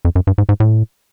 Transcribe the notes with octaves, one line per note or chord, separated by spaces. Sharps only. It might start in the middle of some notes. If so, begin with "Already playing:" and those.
F2
F#2
G2
G#2
G#2
A2